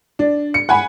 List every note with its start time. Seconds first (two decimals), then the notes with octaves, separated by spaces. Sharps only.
0.19 D4
0.54 C#7
0.69 F#5 G#5 B5